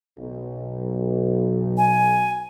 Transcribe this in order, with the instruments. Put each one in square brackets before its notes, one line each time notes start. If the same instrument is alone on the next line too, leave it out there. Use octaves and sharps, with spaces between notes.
[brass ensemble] B1
[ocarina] G#5